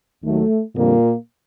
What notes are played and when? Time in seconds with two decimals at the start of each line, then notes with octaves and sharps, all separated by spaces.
0.23 D#2 D#3 F#3 A3
0.75 F2 A#2 D3 G3 A#3